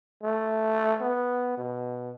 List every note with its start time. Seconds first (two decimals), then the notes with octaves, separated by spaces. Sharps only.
0.23 A3
1.01 B3
1.57 B2